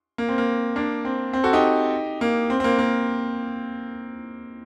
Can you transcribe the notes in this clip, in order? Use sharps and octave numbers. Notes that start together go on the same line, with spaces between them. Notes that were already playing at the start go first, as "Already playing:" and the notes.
A#3
C4
A#3
A#3 D4
C4
C4
F#4 A4
D#4 G4
A#3
C4
C4
A#3
A#3